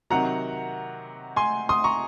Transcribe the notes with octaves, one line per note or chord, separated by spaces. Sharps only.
C3 D#3 F#3 F#5 A#5
G#5 C6
C6 D#6
A#5 C#6